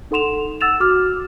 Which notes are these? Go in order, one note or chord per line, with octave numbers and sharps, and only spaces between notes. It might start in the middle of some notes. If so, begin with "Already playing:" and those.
D#4 A4 F#5 C6 E7 F7
F#5 E6 A6 E7 F7
F#4 D6 F6